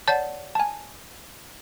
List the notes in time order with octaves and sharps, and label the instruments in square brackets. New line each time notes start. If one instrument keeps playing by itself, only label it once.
[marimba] C#5 D5 F#5 [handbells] A5 G6 A6
[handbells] G#5 A5